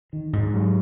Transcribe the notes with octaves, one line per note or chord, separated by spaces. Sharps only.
D#3
G#2
F#3